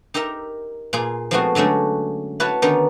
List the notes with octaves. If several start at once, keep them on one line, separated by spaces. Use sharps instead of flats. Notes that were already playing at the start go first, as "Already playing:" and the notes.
D#4 G4 A#4 E5 A#5
A#2 F4 G#4
F3 G#3 A3 B3 C4 F#4
D3 F#3 G#3 A3 C#4
E4 F#4 B4 C#5 F#5 A5
D3 D#3 B3 C#4 D#4